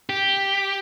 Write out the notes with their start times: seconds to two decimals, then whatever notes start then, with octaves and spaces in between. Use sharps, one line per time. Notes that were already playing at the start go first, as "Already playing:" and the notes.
0.09 G4